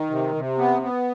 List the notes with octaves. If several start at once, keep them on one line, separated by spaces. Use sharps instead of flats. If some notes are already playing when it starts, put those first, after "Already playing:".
Already playing: D#3
C3
C3
B3
B3